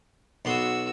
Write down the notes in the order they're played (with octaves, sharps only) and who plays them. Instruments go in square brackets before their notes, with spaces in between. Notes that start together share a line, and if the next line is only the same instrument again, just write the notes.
[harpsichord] B1 B3 C6 [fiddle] F#4 E6